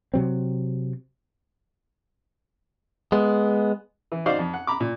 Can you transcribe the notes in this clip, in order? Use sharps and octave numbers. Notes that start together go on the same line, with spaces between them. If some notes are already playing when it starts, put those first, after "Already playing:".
C3 F#3 C4
G#3 B3
E3
D#4 F#4 C5 D5 D#5 F5
F2
F#5
A#5 B5 D6
A#2